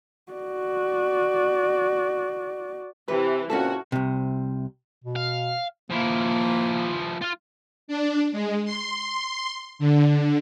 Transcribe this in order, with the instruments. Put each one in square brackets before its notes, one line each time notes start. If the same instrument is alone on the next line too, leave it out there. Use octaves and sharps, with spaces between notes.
[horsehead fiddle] F#4 D5
[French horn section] C3 [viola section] E3 [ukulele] B4
[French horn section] A#2 C#3 C4 [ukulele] C#4 E4 A4 [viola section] F#4
[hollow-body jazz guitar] C2 C3
[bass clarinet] B2
[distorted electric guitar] F5
[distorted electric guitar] F3 E4 [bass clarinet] A#3
[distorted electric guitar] F4 F5
[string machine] D4
G#3
C6
D3